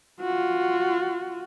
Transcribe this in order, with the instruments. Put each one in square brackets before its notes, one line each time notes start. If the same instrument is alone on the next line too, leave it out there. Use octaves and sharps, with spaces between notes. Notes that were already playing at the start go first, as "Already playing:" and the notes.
[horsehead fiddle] F4 F#4